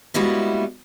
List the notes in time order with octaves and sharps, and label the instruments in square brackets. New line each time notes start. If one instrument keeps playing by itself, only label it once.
[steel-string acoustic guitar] G3 G#3 A#3 B3 E4 F#4